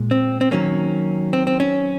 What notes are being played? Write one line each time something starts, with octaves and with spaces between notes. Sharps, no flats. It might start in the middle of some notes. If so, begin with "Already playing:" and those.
Already playing: A#2 G#3
C4
C4
D#3 F#3 A#3 C#4
C4
C4
C#4